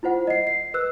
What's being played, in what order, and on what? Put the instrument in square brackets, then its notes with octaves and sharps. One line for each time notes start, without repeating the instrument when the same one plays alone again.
[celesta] E4 F4 C5 F#5
D#5 C7
C7
B4 E6 F#6